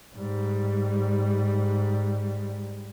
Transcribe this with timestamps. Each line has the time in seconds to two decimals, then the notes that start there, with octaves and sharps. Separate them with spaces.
0.14 G#2 G3